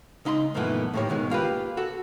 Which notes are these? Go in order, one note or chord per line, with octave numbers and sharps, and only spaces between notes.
C#2 D#4 D#5 B5 C6
F#2 A#2 D#3 E3 A3 B3
A2 D#3 A#3 G4 C#5
G#2 B2 D#3 G#3
A#3 F4 G4 B4
F#4 A4